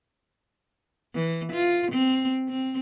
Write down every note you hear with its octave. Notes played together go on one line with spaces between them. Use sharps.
E3
F4
C4
C4